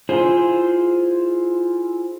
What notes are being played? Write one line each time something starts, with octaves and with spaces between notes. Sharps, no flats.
E4 F4 G#4 C5